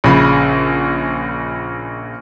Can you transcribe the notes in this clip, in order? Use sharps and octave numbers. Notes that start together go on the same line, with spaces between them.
A#1 C#3 B5